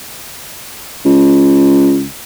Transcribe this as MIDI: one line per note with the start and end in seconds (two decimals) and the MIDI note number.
1.05 2.05 37